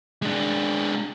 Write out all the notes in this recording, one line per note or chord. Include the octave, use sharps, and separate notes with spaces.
G#3 D4